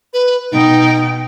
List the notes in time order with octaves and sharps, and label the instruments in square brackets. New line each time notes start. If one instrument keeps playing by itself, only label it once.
[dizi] B4
[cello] B2 G5 [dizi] D#4